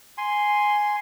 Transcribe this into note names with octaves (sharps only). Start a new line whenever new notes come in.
G#5 C6